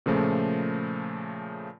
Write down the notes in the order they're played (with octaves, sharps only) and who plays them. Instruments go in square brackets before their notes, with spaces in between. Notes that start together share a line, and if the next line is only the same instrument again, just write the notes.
[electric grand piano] A#2 C#3 F3 A3